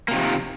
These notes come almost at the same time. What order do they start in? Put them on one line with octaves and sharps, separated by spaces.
A#3 C3 D#3 F3